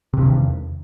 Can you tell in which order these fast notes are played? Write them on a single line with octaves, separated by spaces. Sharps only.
C3 G2 D#3 E2